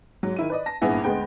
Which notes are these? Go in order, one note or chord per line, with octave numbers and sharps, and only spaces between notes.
G#2 F#3
D#3 E4 D#7
B4 D5 D#5
A5 A#6
G#1 G2 A#2 B3 E4 G#4
D2 G#3 B3 B4 G5